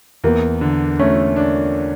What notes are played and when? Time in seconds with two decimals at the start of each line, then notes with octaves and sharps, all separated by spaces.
0.24 E2 A#3
0.61 D3
0.99 A3 C#4
1.36 D4